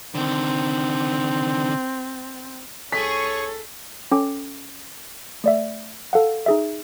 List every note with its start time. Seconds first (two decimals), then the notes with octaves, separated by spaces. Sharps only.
0.15 D3 D#3 C4
2.92 C2 G#4 A4 C#5 C#6 B6
4.11 C#4 A4 G5 D6
5.44 A3 D5 E5
6.13 A4 F5 F#5
6.46 D#4 G#4 E5